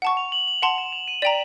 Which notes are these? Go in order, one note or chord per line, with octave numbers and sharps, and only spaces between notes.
F#5 A5 C#6
F7
F#7
F#7
F#5 A5 C6 F7
E7
F7
D#7
D5 G5 A#5 B6